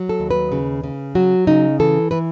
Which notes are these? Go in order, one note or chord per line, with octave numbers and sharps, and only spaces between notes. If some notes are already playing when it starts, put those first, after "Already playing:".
Already playing: F#3
A4
D#2
B4
C#3
C#3
F#3 F#4
C#3 D#4
E3 A4
E3 B4